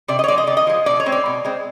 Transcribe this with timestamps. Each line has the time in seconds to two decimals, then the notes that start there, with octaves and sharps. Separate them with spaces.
0.08 C3 D5
0.19 D#5
0.24 C#5
0.28 G#3 D5
0.32 F3
0.38 D#5
0.47 C3 D5
0.57 D#5
0.67 F3 G#3
0.86 B2 D5
1.00 C#5
1.06 G#3 C4
1.12 D5
1.26 B2
1.45 G#3 C4